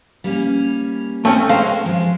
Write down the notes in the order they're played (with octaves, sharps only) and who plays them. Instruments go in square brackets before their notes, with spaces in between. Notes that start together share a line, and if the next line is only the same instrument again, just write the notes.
[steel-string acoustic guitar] G3 A#3 C#4
[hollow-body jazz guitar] A3 C4 C#4
[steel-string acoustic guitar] G#3 A#4 C5 [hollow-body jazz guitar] F5
[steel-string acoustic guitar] F3 G#3